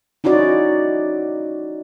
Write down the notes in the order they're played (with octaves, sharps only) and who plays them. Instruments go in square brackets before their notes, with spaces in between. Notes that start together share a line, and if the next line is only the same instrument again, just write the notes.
[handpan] C#4 D#4 E4 F#4 D5